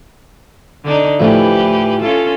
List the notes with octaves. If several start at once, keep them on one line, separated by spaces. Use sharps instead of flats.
D3 D4 D#4
A2 E3 F3 E4 G4 B4
C#4 F4 A4